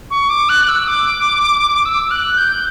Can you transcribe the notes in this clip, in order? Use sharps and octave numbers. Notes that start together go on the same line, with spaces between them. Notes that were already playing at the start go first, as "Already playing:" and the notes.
C#6
D6
F#6
E6
D6
E6
F#6
G6